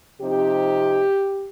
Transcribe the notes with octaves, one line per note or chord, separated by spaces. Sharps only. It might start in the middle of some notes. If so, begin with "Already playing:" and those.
C3 F3 C4 D#4 G4